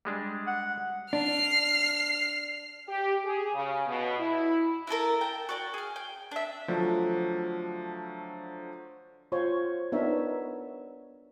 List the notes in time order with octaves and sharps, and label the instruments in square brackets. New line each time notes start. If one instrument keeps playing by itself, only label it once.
[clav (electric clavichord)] G3 G#3 D4
[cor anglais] F#5
[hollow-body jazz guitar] D4 [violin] F6 C7
[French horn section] G4
G#4
C#3
B2
E4
[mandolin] E4 F#4 A4 A#4
G5 A5
F#4 D5 G5
G#4 F6
G5
D4 E5
[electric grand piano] D3 F3 F#3 A3 D4
[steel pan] F4 C5 C#5
B3 D4 D#4 A#4 C#5 E5